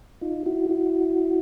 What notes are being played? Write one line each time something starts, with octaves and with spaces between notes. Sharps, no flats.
D#4 F4
E4 F#4
E4 F#4